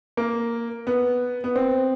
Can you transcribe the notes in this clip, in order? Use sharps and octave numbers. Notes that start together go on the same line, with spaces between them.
A#3
B3
B3
C4